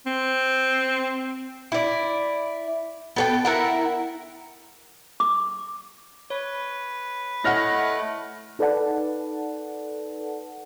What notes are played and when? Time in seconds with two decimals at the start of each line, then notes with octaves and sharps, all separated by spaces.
0.06 C4
1.72 E4 D5
3.16 B3 A4 G5
3.45 E4 A#4 F#5
5.20 D6
6.30 B4 C#5
7.44 A3 E4 C#5 D#5 F#5 F6 A#6
8.59 D#4 A4 B4 D5 F#5 A5